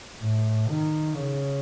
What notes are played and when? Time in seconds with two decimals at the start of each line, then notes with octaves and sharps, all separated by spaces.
0.22 A2
0.69 D#3
1.15 C#3